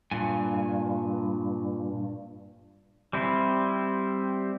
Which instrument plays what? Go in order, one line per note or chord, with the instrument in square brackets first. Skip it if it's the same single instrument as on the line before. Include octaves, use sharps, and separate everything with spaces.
[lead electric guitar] G2 [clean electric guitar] A#2 G#5
[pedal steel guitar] G3 C4 E4